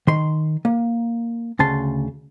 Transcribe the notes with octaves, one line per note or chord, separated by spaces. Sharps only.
D#3 C6
A#3
D2 C#3 A5 C6